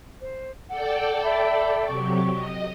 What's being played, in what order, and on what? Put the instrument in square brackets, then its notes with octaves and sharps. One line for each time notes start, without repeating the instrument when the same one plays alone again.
[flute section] C5
[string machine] A4 D5 G5 [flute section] F#5
[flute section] E5 A5 B5
[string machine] C3 F#3 G4 [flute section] C#6
[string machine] D#5